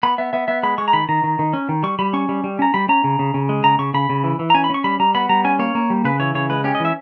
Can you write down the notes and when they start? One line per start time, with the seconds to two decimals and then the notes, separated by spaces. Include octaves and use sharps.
0.03 B3 B5
0.18 B3 E5
0.33 B3 E5
0.48 B3 E5
0.63 G#3 B5
0.78 G#3 C#6
0.88 A#5
0.93 D#3 B5
1.09 D#3 A#5
1.24 D#3
1.39 D#3
1.53 C#4
1.69 D#3
1.83 G3 C#6
1.99 G3 B5
2.13 C#4 C#6
2.29 G3
2.44 G3
2.59 C#4 A#5
2.74 G3 B5
2.89 C#4 A#5
3.04 C#3
3.19 C#3
3.34 C#3
3.49 G#3
3.64 C#3 A#5
3.79 C#3 C#6
3.94 C#3 B5
4.09 C#3
4.24 E3
4.39 E3
4.50 A#5
4.54 C#4 G#5
4.64 B5
4.70 C#4 C#6
4.84 G3 B5
5.00 G3 A#5
5.15 B3 B5
5.29 G3 A#5
5.45 C#4 G#5
5.59 A#3 C#5
5.75 A#3
5.90 G3
6.05 C#3 B4
6.20 E3 C#5
6.35 C#3 C#5
6.50 G#3 B4
6.64 C#4 G4
6.75 D#5
6.80 E3 E5